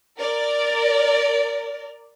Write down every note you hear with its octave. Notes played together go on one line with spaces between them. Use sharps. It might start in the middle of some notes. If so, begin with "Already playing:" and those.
A#4 D5